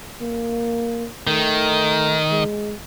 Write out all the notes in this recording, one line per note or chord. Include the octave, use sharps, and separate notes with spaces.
A#3
D#3 A3
G#3